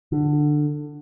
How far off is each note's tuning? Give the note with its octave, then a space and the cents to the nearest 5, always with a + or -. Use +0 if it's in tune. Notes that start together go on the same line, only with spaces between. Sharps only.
D3 +15